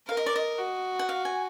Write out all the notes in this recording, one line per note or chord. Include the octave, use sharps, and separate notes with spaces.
A#4 F5
D#5
D5
D#5
F#4
F#5
F5
G#5